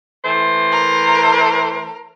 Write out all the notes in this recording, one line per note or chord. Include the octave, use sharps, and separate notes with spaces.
E3 A3 C5
A#4